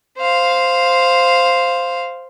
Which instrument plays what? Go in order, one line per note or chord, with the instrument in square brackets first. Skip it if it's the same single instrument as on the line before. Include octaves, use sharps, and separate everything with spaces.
[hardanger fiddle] C5 F5